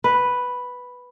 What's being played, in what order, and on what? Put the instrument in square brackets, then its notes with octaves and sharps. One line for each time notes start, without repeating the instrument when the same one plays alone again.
[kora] B4